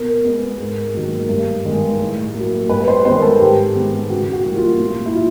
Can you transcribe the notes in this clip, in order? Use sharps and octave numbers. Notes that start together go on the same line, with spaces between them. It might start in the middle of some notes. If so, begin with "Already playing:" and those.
Already playing: B2 A#4
G#3 B3
G#2
D#3 F#3 A#3
G2
D#3 G#3 B3
A2
A#3
F#3
G2 B4
C5
D#3 G#3 B3 C5
A#4
A4
G#2 G4
D#3 G#3 B3
C#3 F#4
F#4
E3 G3 A#3
F4
A#2 F4
E4
F#3 F4